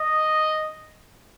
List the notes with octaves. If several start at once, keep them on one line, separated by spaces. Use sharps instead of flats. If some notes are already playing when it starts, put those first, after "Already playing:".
Already playing: D#5